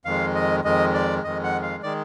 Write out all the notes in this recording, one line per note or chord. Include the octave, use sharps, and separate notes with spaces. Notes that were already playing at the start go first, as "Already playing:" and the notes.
F2 D#3 G#3 F5
D#5
F2 D#3 G#3 D#5
D5
F2 D#3 G#3 D#5
F#5
F5
D#3 G#3 D5